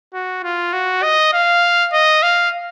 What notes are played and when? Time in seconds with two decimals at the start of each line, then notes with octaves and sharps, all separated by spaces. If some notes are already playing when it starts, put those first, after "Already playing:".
0.14 F#4
0.44 F4
0.73 F#4
1.03 D#5
1.33 F5
1.93 D#5
2.23 F5